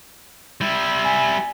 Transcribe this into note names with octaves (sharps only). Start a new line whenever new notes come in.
G3 E4
G#5